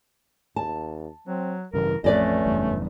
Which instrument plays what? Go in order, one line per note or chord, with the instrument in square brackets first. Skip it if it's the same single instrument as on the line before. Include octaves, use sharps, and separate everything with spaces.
[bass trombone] D#2 [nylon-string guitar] A5
[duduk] F#3 [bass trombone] C4
[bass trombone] A1 [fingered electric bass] G2 C#3 E3 [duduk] A#4
[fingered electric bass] A1 F2 [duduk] A3 [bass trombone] C#4 [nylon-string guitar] B4 D5 D#5
[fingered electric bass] F#1 E2 G2